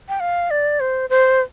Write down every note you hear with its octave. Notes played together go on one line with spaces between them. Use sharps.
G5
F5
D5
C5
C5